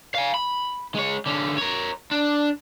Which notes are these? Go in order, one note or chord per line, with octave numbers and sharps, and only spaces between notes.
F5 G#5
B5
G#3 C#5
D3 C#4
A#4 C#5
D4